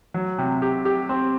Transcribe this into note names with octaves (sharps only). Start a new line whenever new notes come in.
F#3
C3
G4
G4
C4